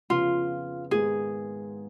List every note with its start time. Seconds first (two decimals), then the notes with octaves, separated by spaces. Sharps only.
0.10 F2 C#3 F3 B3 F4
0.91 G#2 D#3 G#3 B3 G#4